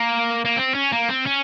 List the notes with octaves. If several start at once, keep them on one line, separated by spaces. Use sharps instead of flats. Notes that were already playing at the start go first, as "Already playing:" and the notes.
Already playing: A#3
A#3
C4
C#4
A#3
C4
C#4